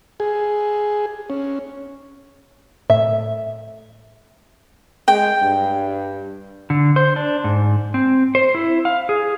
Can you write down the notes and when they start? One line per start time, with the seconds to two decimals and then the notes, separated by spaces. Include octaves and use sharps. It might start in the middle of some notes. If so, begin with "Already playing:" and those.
0.20 G#4
1.30 C#4
2.90 A2 E5
5.08 G#3 G5
5.42 G2
6.70 D3
6.96 C5
7.16 D4
7.44 G#2
7.94 C4
8.35 C5
8.55 E4
8.85 F5
9.09 G#4